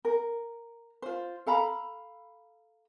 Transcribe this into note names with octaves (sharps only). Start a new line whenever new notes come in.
A#4
F4 C5
A4 F5 A#5 B5